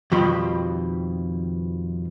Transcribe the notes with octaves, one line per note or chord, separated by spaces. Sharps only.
F2 B2 D#3 G3 B5 C6